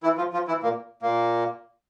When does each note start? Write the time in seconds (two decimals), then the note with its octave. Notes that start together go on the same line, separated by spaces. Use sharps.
0.03 E3 E4
0.18 F3 F4
0.33 F3 F4
0.48 E3 E4
0.63 A#2 A#3
1.02 A#2 A#3